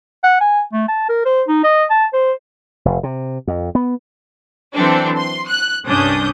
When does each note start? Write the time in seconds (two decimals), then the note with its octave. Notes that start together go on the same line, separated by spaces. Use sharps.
0.24 F#5
0.41 G#5
0.73 A3
0.88 A5
1.09 A#4
1.25 C5
1.48 D#4
1.64 D#5
1.90 A5
2.13 C5
2.85 F1
3.03 C3
3.47 F2
3.75 B3
4.75 E3 F#3 C4 D4 A4
5.17 C6
5.48 F#6
5.85 C2 G2 C#4 D4 D#6 G6